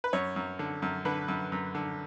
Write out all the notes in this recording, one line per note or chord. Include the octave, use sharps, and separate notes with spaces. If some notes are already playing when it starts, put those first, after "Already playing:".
B4
F#2 C#5
F#2
D3
F#2
D3 B4
F#2
F#2
D3